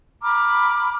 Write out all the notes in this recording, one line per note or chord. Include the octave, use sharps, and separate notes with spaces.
A#5 B5 D6 F6